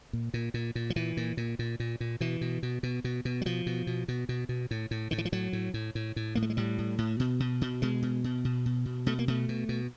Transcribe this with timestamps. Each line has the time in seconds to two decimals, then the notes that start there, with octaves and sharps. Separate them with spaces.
0.13 A#2
0.34 A#2
0.54 A#2
0.75 A#2
0.90 F3
0.96 A#2 E3
1.17 A#2
1.37 A#2
1.59 A#2
1.80 A#2
2.00 A#2
2.21 B2 E3
2.41 B2
2.63 B2
2.83 B2
3.04 B2
3.25 B2
3.41 F#3
3.45 B2 F3
3.66 B2
3.87 B2
4.08 B2
4.29 B2
4.49 B2
4.71 A2
4.91 A2
5.11 A2 D#3
5.18 E3
5.25 F3
5.32 A2 F#3
5.53 A2
5.74 A2
5.95 A2
6.16 A2
6.35 A2 A#3
6.42 A3
6.50 G#3
6.57 A2 G3
6.78 A2
6.98 A2
7.20 B2
7.40 B2
7.61 B2
7.82 B2 G#3
8.02 B2
8.24 B2
8.45 B2
8.66 B2
8.85 B2
9.06 B2 A3
9.19 A#3
9.28 B2 A3
9.49 B2
9.69 B2